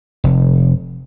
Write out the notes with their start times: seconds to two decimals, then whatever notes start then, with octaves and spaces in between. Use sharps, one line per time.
0.24 F1